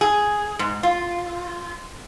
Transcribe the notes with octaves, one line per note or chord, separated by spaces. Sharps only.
G#4
G#2
F4